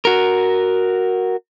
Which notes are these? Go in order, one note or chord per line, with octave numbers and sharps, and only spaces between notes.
F#4 A#4